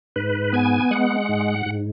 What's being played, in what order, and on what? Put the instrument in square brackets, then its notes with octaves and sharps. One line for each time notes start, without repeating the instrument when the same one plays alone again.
[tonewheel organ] G#2 B4
B3 G#5
G#3 F#5
G#2
G#2